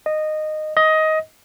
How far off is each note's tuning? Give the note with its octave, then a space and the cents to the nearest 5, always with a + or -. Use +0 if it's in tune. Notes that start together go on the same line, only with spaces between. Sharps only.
D#5 -15
D#5 +15